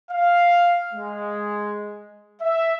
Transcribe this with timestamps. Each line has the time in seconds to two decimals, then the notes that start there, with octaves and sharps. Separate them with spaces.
0.11 F5
0.93 G#3
2.42 E5